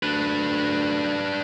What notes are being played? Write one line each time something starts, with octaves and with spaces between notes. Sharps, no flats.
D2 D4 B4